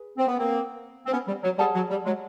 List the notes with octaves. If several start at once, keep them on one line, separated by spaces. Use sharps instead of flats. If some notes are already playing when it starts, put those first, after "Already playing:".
Already playing: G#4 B4
C4
B3
A#3 C4
C4
B3 C#4
G3
F#3
G3 G#4 C#5 F#5 A5
F#3
G3
F#3 G#3